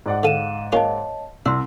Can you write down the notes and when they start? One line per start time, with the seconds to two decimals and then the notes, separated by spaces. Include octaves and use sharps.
0.06 G#2 D5 F#5
0.23 D3 A4 F5 D#7 E7
0.72 A#3 C#4 F4 C#5 D#5 A5
1.46 C2 D4 C6 E6